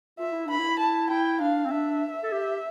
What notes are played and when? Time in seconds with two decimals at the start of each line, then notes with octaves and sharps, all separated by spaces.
0.19 F4 E5
0.32 E4
0.46 D4 B5
0.59 E4
0.80 A5
1.10 E4 G5
1.40 D4 F5
1.65 C4
1.72 D4 E5
2.23 A4
2.32 G4